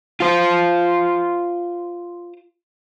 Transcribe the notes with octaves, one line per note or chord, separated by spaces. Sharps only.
F4 C5